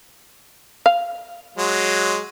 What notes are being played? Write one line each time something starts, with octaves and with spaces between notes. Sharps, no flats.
F5
F#3 G#3